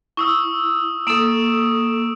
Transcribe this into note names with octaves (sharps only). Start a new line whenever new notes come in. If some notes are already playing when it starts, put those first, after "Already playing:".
E4 C#6 D#6 E6
A#3 A4 D#6 D7 E7